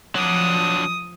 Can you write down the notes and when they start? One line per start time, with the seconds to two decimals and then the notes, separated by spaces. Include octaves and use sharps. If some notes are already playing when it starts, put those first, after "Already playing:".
0.16 F3 F#3 D4 D#6